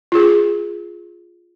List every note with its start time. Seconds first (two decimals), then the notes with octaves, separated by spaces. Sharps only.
0.12 F4 G#4